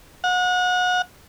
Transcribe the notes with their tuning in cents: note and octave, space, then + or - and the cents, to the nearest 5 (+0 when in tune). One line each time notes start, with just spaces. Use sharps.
F#5 -30